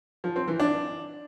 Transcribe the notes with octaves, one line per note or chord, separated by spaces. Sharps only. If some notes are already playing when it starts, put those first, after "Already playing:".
F3
C4
E3
D4